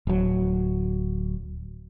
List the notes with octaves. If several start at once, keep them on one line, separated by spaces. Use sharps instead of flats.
D1 F#3